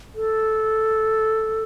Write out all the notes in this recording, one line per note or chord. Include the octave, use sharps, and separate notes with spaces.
A4